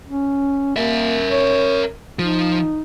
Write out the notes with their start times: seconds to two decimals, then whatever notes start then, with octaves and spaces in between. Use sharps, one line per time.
0.08 C#4
0.77 A#3 A#4 E5
1.30 C#5
2.19 F3 D#4